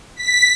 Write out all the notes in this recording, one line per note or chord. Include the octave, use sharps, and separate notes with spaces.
B6